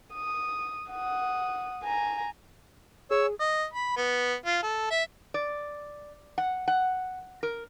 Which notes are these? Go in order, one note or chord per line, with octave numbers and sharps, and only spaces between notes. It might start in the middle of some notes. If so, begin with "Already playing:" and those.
D#6
F#5 D#6
G#5 A#5
G#4 C#5 E6
D#5
B5
B3
F4
A4
E5
D5
F#5
F#5
A#4